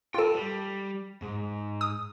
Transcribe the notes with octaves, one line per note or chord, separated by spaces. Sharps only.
F4 A4 G5 A5
G3
G#2
D#6